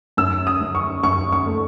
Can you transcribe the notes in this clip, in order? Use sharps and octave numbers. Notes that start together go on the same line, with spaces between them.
F#2 E6
D#6
F#2
C#6
F#2 C#6
C#6
A3